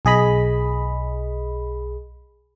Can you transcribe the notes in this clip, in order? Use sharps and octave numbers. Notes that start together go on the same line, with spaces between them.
B1 G#4 D#5 B5